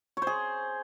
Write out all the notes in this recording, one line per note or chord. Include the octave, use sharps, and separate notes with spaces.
C#5
C5
G#4